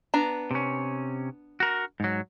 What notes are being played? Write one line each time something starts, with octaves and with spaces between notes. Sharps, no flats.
B3 D4 A#5
C3 C#4
F#4 A#4
G#2 F#3